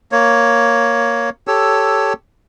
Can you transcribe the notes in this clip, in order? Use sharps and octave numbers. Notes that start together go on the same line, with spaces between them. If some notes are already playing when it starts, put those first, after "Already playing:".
A#3 C#5
G4 A4 C#5 E6